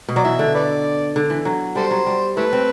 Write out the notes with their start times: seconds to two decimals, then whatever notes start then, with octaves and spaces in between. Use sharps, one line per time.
0.08 B2
0.16 F#3 D5
0.24 E3 E5
0.39 D3
0.55 B4 D5
1.16 D3
1.30 E3
1.45 F#3
1.75 G3 A4 C5
1.91 F#3
2.06 G3
2.37 A3 E4 B4
2.53 C4